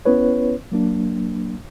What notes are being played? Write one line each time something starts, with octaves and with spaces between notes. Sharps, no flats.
B3 C#4 E4 B4 C#5
F#3 A#3 D4